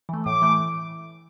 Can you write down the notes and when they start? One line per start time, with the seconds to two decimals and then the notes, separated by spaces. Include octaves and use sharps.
0.09 E3 A3
0.26 A2 D6
0.42 E3 A3